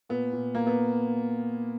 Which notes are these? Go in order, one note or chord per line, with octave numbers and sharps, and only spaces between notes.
A#2 B3
A#2
A#2 A#3
B3